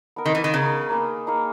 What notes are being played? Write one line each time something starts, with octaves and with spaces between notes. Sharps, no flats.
B3 D#4 A#4
D#3
E3
D#3
C#3 B3 D#4 A#4
A#3 D#4 G#4 B4
A#3 D#4 G#4 B4